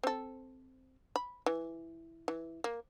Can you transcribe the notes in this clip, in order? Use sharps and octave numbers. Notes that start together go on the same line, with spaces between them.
C4 A4
B5
E3
E3
A#3